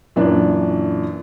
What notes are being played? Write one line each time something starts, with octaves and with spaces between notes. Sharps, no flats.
F#2 A#2 E3 D4